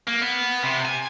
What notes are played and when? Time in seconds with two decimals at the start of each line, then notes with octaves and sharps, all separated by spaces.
0.08 A#3
0.22 B3
0.63 C3
0.85 G#5